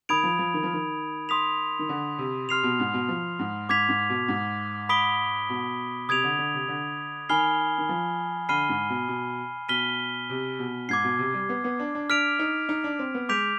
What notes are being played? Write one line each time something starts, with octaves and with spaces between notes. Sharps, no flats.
D#3 B5 D#6 G#6 D7 F7
F3
F3
D#3
F3
D#3
C6 D#6 B6 F7
D#3
D3
C3
C3 C6 F6 C7 F7
B2
G#2
B2
F3
G#2
G#2 D6 G#6 B6 F7
G#2
B2
G#2
B5 D#6 B6 D7 G7
B2
C3 D#6 G#6 D7 F7
D3
D3
C3
D3
D#3 G#5 B5 F6 C7 G7
D#3
F3
D3 B5 F6 C7 D#7 G7
G#2
B2
B2
B2 F6 B6 D#7 G7
C3
B2
G#2 D6 G#6 C7
B2
C3
G3
B3
B3
D4
D4
D4 F6 B6 D7 F7
D#4
D#4
D4
C4
B3
G#3 D6 G6 B6 D7 F7